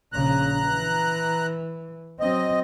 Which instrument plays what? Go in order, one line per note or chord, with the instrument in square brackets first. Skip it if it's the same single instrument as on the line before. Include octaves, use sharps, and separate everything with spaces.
[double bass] A#1 C#3 [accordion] A#5 F#6
[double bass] E3
[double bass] F#3 C4 [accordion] D#5